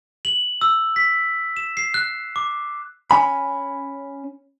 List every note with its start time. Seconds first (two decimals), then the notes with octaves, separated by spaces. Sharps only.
0.25 F#7
0.61 E6
0.96 B6
1.57 E7
1.77 C7
1.94 F#6
2.36 D6
3.11 C#4 G#5 B5